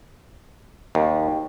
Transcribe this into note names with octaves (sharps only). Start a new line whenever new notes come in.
D#2